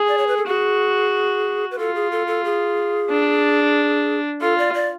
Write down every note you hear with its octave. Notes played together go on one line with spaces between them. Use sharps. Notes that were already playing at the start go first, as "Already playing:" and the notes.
Already playing: G#4
D5
C#5
B4
A4
F#4 G#4
B4
F4 A4
G#4
A4
A4
G#4
D4
F4 A4
D5
D5